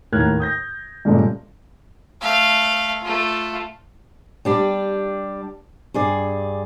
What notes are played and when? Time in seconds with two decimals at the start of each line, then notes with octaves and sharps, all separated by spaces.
0.12 D#2 A2 A#4 F6 F#6 G#6
0.40 D#6 G6 A#6
1.05 G2 A#2 C#3 G#3 A3 F4
2.21 A3 F5
3.02 A3 F4
4.45 G3 D4 G4
5.94 G2 G#4 D5